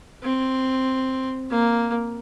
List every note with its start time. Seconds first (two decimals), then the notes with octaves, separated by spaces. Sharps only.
0.23 C4
1.50 A#3